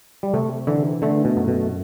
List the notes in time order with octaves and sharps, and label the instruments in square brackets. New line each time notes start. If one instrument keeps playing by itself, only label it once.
[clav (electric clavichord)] G3
[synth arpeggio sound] C3 [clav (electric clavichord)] A3
[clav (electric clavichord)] D3 [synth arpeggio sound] E3
[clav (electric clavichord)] D3 [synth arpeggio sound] A3
[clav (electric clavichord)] B2
[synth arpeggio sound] F#2
[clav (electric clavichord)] B2